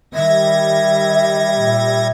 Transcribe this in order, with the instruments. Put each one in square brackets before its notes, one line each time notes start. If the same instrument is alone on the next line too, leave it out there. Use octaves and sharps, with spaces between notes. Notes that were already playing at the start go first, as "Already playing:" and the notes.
[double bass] D#3 [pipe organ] G3 G#6 A#6 [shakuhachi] E5
[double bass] A#2